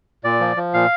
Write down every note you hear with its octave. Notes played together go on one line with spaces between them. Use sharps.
A#2 D5
F3
F3
A#2 F5